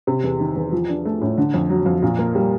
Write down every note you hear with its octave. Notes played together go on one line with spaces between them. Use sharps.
C3
E2
D#3
E2
F3
D4
A3
A2
D3
F2
F#3
F2
A#2
A#3
G3